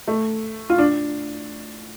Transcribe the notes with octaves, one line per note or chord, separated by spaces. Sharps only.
A3
F4
D4